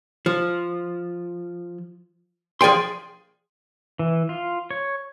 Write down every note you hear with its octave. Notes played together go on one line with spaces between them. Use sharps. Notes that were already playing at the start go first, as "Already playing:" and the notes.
F3
F3 G#4 D5 G5 C6
E3
F4
C#5